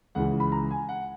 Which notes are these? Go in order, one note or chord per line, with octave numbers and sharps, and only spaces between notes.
C#2 C#3 E3 F#5
B5
A#5
G#5
F#5